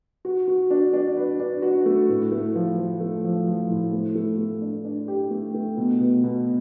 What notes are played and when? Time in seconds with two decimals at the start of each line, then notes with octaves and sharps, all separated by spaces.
0.25 F#4
0.48 F#4
0.71 D4
0.93 D4
1.17 B4
1.40 D4
1.62 F#4
1.86 A3
2.09 A2
2.31 A3
2.55 F3
2.77 F3
3.00 A3
3.24 F3
3.47 F3
3.70 A2
3.93 A3
4.15 A3
4.38 A3
4.62 D4
4.85 D4
5.08 G4
5.30 A3
5.54 A3
5.77 B2
6.00 B2
6.24 B2